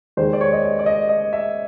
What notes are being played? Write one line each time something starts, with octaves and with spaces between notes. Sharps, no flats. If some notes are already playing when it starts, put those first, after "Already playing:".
D#2 D#3 G#3 C5
D5
C#5
D#5
D5
D5
D#5
D#5
E5